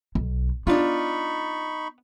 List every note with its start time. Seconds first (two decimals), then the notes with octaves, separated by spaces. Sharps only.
0.15 B1
0.67 B3 D4 D#4 F4 B5 C#6